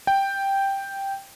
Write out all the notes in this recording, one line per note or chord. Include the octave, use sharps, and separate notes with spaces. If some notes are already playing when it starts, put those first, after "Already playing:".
G5